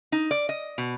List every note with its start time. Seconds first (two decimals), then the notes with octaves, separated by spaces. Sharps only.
0.12 D#4
0.31 D5
0.49 D#5
0.78 B2